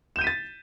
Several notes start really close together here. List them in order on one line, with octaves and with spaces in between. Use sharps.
E7 G6 D#7 B6 A6